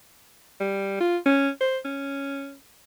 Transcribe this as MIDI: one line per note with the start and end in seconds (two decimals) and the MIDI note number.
0.60 0.96 55
1.00 1.17 65
1.26 1.49 61
1.61 1.78 72
1.85 2.54 61